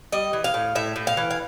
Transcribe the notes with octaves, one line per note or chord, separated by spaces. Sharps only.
G3 D#5
E3
F5
A2
A2 E5
A2
F5
E3
F5